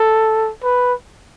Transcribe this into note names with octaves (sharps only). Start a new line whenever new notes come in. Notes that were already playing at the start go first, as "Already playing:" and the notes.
Already playing: A4
B4